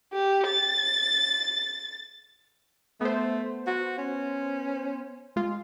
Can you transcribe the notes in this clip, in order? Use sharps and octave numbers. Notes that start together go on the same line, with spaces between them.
G4
A6
A3 B3 C5
F#4
C#4
G#3 F4